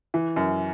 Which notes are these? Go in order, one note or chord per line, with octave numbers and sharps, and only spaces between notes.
E3
F#2